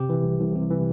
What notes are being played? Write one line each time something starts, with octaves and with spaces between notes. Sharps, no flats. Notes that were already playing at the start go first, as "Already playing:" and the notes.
Already playing: C3 G4
E3
C2
C2
C3
E3